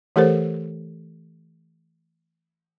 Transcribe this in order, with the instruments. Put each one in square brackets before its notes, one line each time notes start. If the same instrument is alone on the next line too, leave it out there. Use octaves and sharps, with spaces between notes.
[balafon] E3 A3 G4 A4 A#4 C5